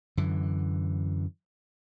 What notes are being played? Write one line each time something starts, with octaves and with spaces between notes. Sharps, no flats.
F#2 D3 E3